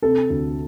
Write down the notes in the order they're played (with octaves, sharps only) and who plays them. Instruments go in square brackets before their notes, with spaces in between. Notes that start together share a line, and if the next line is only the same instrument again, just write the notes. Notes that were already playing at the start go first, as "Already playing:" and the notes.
[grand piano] C3 A4
D2